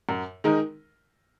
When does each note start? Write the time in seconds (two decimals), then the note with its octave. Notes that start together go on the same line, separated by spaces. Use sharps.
0.09 F#2
0.44 D#3 G#3 D#4 A#4